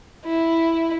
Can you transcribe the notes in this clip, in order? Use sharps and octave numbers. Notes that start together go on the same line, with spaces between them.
E4